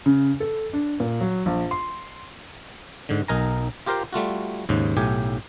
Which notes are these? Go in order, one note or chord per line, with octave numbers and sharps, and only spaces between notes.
C#3
A4
D4
A#2
F#3
A#1
C6
G#2 D3
B1 D#4 A#4 G#5 A#5
F4 G4 A#4 C5 F5 G5
G3 A3 F4 F#4
D#2 G#2 C#3
B1 A2 G4 G#5